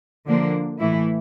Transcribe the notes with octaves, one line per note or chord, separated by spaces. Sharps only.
D3 F3 A#3 D4
A2 E3 A3 E4